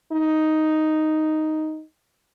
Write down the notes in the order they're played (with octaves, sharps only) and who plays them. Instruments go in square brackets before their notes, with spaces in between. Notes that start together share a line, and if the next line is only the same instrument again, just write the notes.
[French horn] D#4